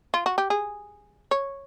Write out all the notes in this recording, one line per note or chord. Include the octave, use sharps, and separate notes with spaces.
F4
F#4
G4
G#4
C#5